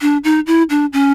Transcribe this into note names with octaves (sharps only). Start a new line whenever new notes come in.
D4
D#4
E4
D4
C#4